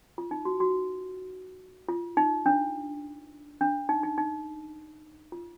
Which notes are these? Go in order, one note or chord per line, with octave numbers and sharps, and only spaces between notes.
F4
D#4
F#4
F#4
F4
D#4
D4
D4
D#4
D#4
D#4
F4